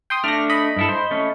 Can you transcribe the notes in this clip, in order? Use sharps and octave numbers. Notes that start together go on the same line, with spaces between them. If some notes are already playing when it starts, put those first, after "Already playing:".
G5 C6 D#6
A3 D4 D5 F6 A#6
D#5 B5
G2 E4 A4
C5
A3 C#4